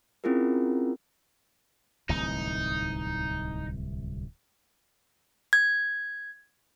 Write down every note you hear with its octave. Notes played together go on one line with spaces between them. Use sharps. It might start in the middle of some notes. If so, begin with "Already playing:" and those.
C4 C#4 E4 F4 G#4 A#4
D1 C2 E3 D#4
G#6